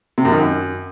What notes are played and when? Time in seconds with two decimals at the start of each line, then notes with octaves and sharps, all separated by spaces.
0.18 C3
0.25 F#2
0.32 D#3
0.39 F#2